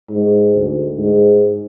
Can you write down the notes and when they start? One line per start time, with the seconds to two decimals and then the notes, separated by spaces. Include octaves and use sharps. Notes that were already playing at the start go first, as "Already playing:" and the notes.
0.10 G#2
0.56 D2
0.98 G#2